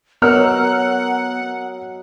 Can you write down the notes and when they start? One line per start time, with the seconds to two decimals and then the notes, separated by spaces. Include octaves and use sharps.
0.22 F#3 B3 D#4 A#4 F#5 E6 F6